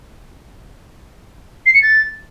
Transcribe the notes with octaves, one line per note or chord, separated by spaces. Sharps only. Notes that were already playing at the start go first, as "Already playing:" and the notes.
C7
C#7
A6